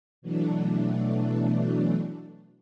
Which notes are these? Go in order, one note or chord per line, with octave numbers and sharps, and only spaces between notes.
B2 E3 F#3 A3 D4